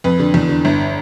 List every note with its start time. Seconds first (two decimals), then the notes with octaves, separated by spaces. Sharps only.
0.04 F2 B4
0.19 D3
0.34 E2
0.49 D3
0.65 G1